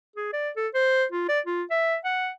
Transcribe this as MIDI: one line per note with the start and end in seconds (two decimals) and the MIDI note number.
0.16 0.28 68
0.33 0.49 74
0.56 0.68 69
0.74 1.04 72
1.12 1.26 65
1.28 1.40 74
1.46 1.63 65
1.71 1.96 76
2.05 2.30 78